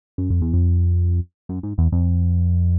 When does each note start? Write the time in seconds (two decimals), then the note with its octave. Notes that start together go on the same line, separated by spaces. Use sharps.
0.18 F#2
0.30 F2
0.42 E2
0.53 F2
1.49 F#2
1.63 G#2
1.78 E2
1.92 F2